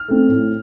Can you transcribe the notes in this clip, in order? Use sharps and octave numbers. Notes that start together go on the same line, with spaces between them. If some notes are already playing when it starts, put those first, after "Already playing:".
Already playing: F6
A3 C4
A2